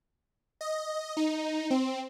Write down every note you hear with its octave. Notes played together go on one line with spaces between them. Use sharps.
D#5
D#4
C4